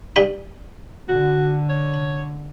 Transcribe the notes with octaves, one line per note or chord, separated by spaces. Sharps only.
G2 G5 B5
D3 F#4
C#5